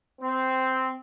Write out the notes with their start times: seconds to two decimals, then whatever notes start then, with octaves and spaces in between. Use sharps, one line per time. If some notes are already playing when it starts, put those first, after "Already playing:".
0.21 C4